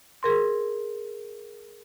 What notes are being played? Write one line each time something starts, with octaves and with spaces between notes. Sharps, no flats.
G#4 A#4 C6